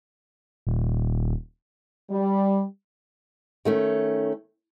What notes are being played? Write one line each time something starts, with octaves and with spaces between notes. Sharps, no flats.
D#1
G3
D#3 A3 C#4